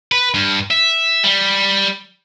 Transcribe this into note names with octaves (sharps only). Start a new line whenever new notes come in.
B4
G2
E5
G3